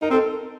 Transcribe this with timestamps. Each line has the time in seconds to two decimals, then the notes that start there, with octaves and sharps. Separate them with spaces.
0.02 D#4 A#4
0.11 C4 A4